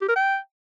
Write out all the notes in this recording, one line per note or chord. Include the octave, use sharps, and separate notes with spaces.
G4
A#4
G5